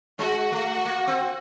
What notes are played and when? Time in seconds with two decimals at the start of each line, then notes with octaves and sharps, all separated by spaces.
0.19 G#3 F#4
0.52 A3
0.85 A#3
1.07 C4